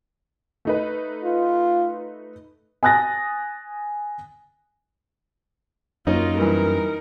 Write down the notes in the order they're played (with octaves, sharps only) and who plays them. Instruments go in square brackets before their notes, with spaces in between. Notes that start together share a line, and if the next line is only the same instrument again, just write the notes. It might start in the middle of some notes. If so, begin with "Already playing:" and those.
[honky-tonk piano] A3 D#4 B4
[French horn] F4
[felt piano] G#5 D#6 F#6 A6 A#6
[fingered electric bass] F#2 [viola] A#3 F4 [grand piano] D#4 [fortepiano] C#5 D#5
[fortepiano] G2 E3 [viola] A#4